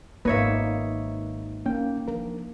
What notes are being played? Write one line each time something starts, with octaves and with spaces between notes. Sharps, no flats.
G#1 A#3 B3 D#4 B4 C#5 E5
A#3 C#4 G5
F3 D4 A#4